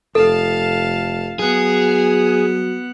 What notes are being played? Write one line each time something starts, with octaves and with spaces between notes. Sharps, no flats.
F1 A4 F5 A5
F#3 B3 G#4 F#5